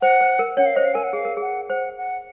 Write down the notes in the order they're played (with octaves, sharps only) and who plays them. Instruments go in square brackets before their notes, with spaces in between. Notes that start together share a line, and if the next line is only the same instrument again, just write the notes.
[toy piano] C5 [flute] F#5
[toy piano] C5
A#4
[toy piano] C#4 C#5 [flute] F#5
[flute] F5
[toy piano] C5 [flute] D#5
[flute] F5
[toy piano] A#4 [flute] G#5
[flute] F#5
[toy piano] G#4 [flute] F5
[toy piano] A#4
[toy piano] G#4 [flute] F#5
[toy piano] C5 [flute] F#5
[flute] F#5